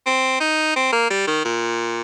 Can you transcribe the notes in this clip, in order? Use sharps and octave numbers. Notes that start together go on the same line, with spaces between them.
C4
D#4
C4
A#3
G3
D#3
A#2